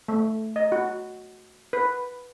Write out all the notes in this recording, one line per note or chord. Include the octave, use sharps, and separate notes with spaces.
A3
D#5
F#4
B4